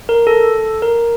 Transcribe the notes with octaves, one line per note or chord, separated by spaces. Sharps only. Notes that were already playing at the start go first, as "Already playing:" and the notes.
A#4
A4
A#4